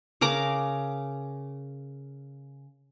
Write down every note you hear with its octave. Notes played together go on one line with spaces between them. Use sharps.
C#3 A#4 A#5 D6